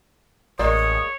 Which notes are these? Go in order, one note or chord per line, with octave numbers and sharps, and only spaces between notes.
A1 G#3 A#3 C#5 D5 D#6